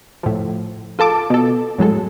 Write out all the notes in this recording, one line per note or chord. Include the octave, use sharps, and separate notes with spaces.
A2 F3
F4 A4 A5 D6
B2 A4
A2 F#3 G#3 A4